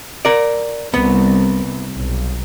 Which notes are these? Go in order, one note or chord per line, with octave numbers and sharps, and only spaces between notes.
A#4 D5
C2 B3
B1